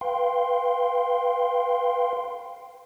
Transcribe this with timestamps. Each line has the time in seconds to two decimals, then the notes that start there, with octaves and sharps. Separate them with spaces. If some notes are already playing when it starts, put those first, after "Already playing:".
0.01 B4 F5 G5 C6